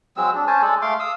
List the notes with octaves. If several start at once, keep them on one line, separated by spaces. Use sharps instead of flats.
F#3 G#3 C4 E6
D4
C#4 C5 G#5 A5
G#3 A4 D5
A3 F5 C6 D6
F5 D#6 E6